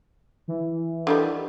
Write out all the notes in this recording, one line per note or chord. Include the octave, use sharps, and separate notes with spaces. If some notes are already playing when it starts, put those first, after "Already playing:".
E3
D3 D#3 G3